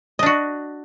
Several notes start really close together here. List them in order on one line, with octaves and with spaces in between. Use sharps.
D#5 D4 F#4